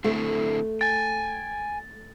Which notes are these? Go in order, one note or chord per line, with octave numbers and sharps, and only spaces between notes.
D3 A3 C4 E4
G5 G#5 A6